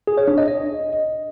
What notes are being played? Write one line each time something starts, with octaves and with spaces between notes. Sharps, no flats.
G#4
C#5
D4
D#5
D#5